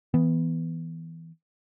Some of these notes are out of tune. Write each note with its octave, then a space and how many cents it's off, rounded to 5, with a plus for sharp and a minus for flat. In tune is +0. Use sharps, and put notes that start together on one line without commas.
E3 -10 B3 +0